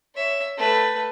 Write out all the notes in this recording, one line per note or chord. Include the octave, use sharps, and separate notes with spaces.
C#5 E5
A3 B4